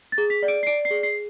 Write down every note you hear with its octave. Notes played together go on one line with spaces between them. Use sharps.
A6
G#4
B6
D5
D7
C7
D5 D7
C7
G#4
C7